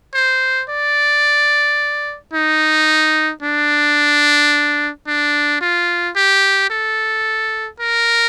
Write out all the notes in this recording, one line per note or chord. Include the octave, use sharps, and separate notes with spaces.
C5
D5
D#4
D4
D4
F4
G4
A4
A#4